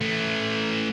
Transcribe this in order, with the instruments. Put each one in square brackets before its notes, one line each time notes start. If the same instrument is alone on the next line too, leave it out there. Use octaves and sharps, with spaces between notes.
[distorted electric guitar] E3 A3